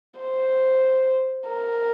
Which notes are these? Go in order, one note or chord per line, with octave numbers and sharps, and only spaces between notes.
C5
A#4